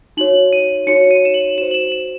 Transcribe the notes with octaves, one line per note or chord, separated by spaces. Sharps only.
D#4 F#4 C#5 F#7
D#7
D#4 F#4 C#5 C#7
D#7
E7
F#7
F#4 C5 E7
F#7
E7
E7